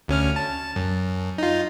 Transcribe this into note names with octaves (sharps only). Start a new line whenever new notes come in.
D2 C#4 F6
A5
F#2
D#4 F4